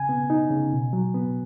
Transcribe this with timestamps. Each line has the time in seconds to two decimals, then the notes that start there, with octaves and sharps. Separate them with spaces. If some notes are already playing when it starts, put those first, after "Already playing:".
Already playing: C#3 G#5
0.09 B3
0.30 D#4
0.50 C#3
0.73 B2
0.93 F#3
1.14 B3